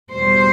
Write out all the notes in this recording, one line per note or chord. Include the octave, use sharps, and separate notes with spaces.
E2 B2 G3 C5